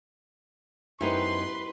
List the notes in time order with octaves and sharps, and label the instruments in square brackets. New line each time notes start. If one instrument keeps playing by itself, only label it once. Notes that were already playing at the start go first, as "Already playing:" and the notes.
[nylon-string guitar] F#2 B3 D#4 [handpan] E4 G4 C5 [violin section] B4 [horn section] C6